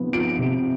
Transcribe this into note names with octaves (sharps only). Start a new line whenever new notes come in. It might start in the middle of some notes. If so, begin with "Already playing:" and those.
Already playing: C3 F3 B3
F4 D7
C3